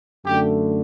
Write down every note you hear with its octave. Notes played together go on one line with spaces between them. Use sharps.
F#2 D3 A3 G4